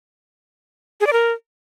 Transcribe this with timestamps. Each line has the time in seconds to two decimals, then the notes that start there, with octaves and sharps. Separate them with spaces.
1.01 G#4
1.07 D5
1.13 A#4